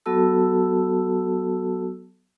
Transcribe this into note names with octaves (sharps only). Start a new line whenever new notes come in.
F#3 B3 F#4 A4 A5 E6